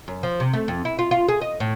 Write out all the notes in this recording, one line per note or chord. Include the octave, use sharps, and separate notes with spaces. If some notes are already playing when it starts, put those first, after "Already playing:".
F#2
F3
C3
A3
F2
E4
F4
F4
G#4
D#5
A2